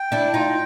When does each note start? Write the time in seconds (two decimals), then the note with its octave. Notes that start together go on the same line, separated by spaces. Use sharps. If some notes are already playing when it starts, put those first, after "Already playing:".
Already playing: G5
0.12 D4 E4
0.34 D#4 F4